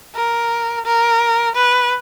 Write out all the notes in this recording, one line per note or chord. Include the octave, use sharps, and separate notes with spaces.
A#4
A#4
B4